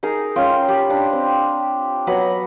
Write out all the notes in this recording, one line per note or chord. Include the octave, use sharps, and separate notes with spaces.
D#4 G#4 A#4
C#4 F4 G5
G4 B5
D4
C4
F#3 B3 D#5 B5